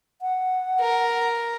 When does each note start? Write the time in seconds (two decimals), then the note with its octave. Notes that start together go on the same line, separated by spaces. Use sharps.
0.22 F#5
0.80 A#4